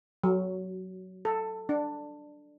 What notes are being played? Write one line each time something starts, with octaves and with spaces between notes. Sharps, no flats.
F#3
A4
D4